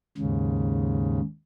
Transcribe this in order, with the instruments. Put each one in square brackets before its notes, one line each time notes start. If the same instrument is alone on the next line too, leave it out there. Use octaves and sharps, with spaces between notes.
[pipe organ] D#2 G#2 C#3